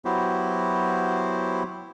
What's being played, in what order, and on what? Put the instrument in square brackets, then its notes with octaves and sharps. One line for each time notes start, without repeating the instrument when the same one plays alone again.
[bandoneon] F#3 B3 E4 F#4 G4 C5